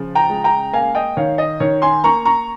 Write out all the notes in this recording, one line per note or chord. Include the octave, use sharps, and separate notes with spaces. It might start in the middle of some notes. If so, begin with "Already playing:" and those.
Already playing: C#3 F3
G5 A#5
G#3
G5 A#5
A#3 F5 G#5
D#5 G5
D#3 C#5 F5
D#5
D#3 C#5
G#5 C6
A#3 A#5 C#6
A#5 C#6